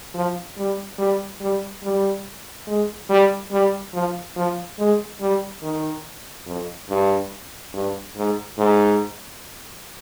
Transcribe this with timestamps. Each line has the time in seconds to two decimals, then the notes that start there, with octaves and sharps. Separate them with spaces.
0.14 F3
0.57 G3
0.98 G3
1.41 G3
1.83 G3
2.67 G#3
3.10 G3
3.52 G3
3.94 F3
4.37 F3
4.79 G#3
5.21 G3
5.63 D#3
6.47 F2
6.90 G2
7.74 G2
8.16 G#2
8.58 G#2